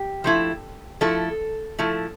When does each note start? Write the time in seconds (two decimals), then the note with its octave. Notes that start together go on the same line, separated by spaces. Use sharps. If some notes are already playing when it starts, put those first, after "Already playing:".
Already playing: G4
0.24 F3 A3 E4
1.01 F3 A3 E4 A4
1.79 F3 A3 E4